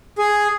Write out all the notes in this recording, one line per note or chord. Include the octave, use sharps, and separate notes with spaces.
G#4